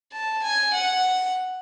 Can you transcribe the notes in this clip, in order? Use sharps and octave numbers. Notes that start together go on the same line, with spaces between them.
A5
G#5
F#5